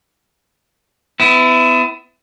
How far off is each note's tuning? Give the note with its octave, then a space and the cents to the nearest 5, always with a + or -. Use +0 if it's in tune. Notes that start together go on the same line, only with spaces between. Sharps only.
B3 +35 E4 +0